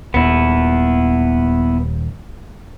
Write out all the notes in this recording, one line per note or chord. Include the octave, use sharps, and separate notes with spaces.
D#1 D#2 B3 E4